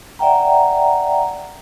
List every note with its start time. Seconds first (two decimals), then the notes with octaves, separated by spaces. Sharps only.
0.19 D5 E5 F#5 G5 A#5